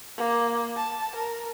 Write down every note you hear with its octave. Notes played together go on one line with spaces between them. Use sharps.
A#3
A5
A#4